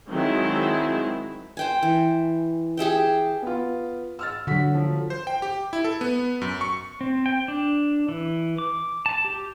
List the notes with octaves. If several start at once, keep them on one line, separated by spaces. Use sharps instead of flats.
D#3 F#3 G#3 C4 E4
C5 G5 G#5
E3
G4 G#4 E5 G5
B3 F4
E6 F6 A6
D3 F#3 F#4 B6
F3
C5
G5
G4
E4
A4
B3
F#2
C#6
C4
G5
D4
E3
D6
A5
G4